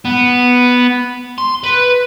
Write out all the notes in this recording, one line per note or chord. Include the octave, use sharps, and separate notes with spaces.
B3
C6
B4